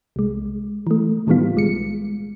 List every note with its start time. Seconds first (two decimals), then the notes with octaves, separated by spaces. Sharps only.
0.16 C2 G#3
0.87 E3 A3
1.27 A2 D#3 E3 G3 B3 F4
1.55 B1 G#3 C#7